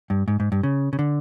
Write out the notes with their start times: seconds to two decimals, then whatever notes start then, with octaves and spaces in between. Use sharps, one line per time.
0.10 G2
0.28 G#2
0.40 G#2
0.52 G2
0.63 C#3
0.93 C#3
0.99 D3